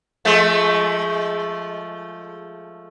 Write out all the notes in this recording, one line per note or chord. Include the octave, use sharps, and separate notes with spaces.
F3 G#3 A3